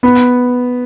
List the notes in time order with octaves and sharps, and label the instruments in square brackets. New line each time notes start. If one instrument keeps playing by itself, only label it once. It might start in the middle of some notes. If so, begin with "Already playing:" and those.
[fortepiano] B3